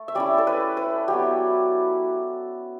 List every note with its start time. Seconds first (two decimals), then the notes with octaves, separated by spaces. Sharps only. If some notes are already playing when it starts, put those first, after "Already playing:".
Already playing: A3
0.08 E5
0.15 G3 C#4 E4 D5
0.38 A4
0.47 B4
0.77 B4
1.08 F#3 B3 E4 G4